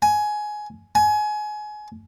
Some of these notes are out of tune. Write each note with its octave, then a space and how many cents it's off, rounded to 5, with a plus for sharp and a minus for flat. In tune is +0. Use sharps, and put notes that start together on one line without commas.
G#5 +15
G#5 +25